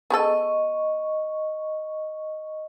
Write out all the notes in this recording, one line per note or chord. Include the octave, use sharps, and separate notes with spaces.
B3 G#4 A4 D#5 C#6